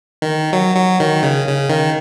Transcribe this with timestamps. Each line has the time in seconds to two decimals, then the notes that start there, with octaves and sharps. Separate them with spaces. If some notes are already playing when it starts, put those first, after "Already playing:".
0.22 D#3
0.53 F#3
0.76 F#3
1.00 D#3
1.23 C#3
1.47 C#3
1.70 D#3